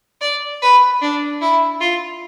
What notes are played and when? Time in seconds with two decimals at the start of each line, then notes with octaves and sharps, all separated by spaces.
0.21 D5
0.62 B4
1.01 D4
1.41 E4
1.80 F4